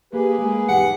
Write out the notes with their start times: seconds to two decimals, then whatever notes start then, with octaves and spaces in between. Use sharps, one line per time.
0.13 A#3 G4 G#4 B4
0.39 G#3 A#3
0.69 B1 E2 G#2 G4 F#5